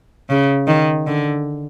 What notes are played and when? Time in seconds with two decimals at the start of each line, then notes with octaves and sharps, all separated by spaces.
0.30 C#3
0.67 D#3
1.07 D3